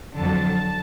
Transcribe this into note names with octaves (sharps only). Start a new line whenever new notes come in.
F2 D3 F#3 A5